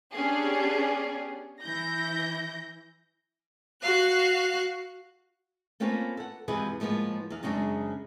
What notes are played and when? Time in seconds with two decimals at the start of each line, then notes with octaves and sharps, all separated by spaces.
0.14 B3 C#4 D4 G4 G#4
1.63 E3 E4 G6 A#6
3.82 F#4 F5 F#6
5.80 A3 A#3 C4 C#4 F4 B4
6.17 A4 F#5
6.48 E2 C3 F3 G#3 G#4 B4
6.80 A2 F3 G#3 A#3 B3
7.30 E2 F5
7.43 F#2 C#3 G3 G#3 C4 D4